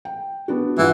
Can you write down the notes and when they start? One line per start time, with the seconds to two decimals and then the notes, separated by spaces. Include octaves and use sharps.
0.05 G5
0.48 B3 D4 F#4
0.78 G2 E3 F4 F#5